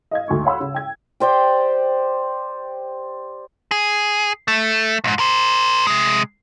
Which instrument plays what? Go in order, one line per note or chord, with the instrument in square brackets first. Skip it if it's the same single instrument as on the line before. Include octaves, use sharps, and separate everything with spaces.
[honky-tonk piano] D#5 F5 G#6
D2 G#2 C#6
C#5 F5 F#5 B5 C6 E6
C#3
G5 G#6
[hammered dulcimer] G4 C5 D5 G5
[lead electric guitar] G#4
A3
C2 G#2
A#4 C5
C3 G#3